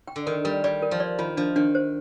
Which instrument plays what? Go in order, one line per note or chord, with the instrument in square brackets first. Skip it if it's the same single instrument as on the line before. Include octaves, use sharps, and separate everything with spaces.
[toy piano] G5
[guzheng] D3
[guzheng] D#3 [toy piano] A#4
[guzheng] G3 [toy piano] A#4
[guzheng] G3 [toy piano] D5
[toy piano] A#4
[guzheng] F3
[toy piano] D5
[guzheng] D#3 [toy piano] F4
[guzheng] F3 [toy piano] D4
[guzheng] D#3 [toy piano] D4
[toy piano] C5